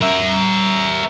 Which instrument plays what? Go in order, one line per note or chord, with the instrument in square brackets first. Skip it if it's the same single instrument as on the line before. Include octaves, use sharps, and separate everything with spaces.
[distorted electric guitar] A#4 E5